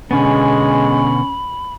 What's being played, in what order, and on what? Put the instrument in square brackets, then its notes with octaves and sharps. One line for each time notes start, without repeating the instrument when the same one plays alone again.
[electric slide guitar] B2 D3 B3 [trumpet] G#3 [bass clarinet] C#4 [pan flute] B5